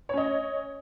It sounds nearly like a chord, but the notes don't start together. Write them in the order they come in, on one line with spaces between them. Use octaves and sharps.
C#5 C#4 D#5